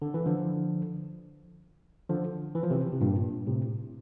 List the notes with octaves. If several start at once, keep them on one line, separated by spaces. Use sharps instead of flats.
D3
E3
D3 F3
D3 F3
E3
F3
C3 E3
C3
G2 A#2
A2 C3